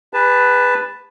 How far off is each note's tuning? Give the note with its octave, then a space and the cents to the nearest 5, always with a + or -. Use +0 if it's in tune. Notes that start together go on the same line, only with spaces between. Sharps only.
G#4 -45 B4 +0 A5 +0